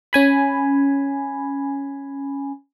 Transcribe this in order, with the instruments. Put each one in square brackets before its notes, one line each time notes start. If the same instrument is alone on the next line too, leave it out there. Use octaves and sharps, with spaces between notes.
[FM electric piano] C#4 G#5 B5